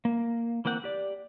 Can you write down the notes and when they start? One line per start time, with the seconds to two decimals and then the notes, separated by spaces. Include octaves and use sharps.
0.05 A#3
0.65 E3 A#3 C4 F#5 G6
0.84 G4 D5